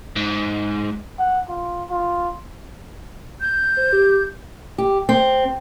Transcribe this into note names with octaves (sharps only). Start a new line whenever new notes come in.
G#2
F#5
F4
F4
G6
C5
G4
G4
C4